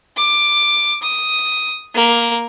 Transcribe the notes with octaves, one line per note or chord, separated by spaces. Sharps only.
D6
D#6
A#3